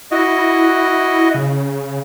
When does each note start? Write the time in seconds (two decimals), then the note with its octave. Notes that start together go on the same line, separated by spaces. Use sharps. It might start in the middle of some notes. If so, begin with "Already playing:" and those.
0.11 E4 F#4 D#5
1.35 C#3